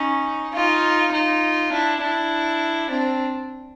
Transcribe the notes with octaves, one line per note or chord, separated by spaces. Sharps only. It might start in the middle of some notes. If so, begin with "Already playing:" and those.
Already playing: C#4 D#4
D#4 F4
D#4 F4
D4 E4
D4 E4
C4 D4